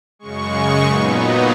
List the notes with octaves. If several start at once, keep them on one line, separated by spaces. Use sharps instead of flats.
F#2 C#3 G#3 C#6
A#2 F#3 B3 D#4 B5